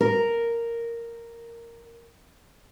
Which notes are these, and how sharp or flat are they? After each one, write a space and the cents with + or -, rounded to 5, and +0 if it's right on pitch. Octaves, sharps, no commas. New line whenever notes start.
A#4 -5